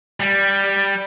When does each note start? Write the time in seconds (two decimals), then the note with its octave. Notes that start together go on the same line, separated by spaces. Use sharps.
0.20 G3